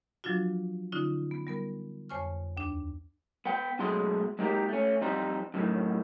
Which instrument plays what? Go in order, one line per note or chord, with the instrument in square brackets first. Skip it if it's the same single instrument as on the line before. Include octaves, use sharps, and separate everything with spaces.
[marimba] F3 F#3 D4 F4 F#4
D3 C#4 D#4 F4
B3
G3 B3 A#4
F2 C5 C#5 G#5 C#6 F6
D#2 D4
[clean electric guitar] B3 G5
F#2 B2 G#3 A3 C6
G#3 A#3 D#4 G4 A#4
A3 C#4
F2 G3 D#4 C5
F#2 A2 D#3